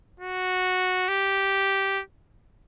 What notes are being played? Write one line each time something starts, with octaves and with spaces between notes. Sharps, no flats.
F#4
G4